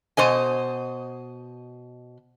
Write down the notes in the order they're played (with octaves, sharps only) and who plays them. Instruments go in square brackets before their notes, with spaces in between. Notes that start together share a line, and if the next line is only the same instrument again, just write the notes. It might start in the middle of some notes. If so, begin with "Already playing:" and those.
[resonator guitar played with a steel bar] B2 C5 D#5 G#5